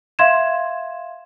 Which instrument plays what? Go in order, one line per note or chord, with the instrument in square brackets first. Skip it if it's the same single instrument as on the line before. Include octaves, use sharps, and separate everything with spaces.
[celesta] E5 F5 C6 G#6 E7